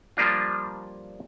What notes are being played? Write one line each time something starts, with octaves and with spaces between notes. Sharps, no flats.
F3 G3 A#3 D4 F4